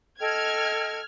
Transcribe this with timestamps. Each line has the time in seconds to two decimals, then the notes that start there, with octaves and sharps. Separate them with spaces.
0.20 A4 D#5 G5 F6 G#6